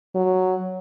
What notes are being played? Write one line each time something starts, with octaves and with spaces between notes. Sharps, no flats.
F#3